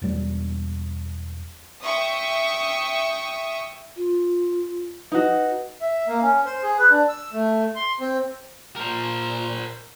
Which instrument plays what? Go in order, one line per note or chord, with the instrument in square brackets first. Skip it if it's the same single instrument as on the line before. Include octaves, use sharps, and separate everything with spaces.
[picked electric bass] E1 G3
[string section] E5 G5 C#6 D#6
[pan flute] F4
[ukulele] D#4 F#4 [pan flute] B4
[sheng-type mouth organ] E5
A#3
C#4
C5
G#4
B4
D4
E6
A3
C6
C4
[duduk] A#2 [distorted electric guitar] A#4 C5